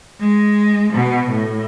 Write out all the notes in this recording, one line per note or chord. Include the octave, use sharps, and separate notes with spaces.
G#3
B2
A2